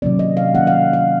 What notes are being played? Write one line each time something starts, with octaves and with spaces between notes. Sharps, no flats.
C3 D#3 F#3 A#3 C#4 D5
D#5
F5
C3 D#3 F#3 A#3 C#4 F#5
F5
F5